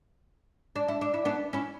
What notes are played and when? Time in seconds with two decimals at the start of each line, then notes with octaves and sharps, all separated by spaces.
0.76 D4
0.88 E4
1.01 D4
1.14 E4
1.25 B3 D4
1.53 C#4 E4